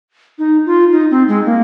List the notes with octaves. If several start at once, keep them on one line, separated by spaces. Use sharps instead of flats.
D#4
F4
D#4
C4
G#3
A#3